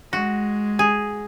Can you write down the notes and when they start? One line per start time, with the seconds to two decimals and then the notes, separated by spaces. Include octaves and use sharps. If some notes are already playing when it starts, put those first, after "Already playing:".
0.12 G#3 F#4
0.79 G#4